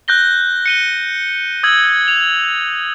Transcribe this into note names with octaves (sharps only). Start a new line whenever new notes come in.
F#6 G6 A#6 G7
C#7 D#7 G7
D#6 E6 G#6 F#7
F7